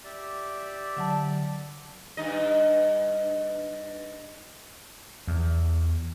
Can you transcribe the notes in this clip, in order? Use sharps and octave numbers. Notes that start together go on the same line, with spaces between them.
G4 D5 E5
D3 F#3 A5
G2 D#4 D#5
E2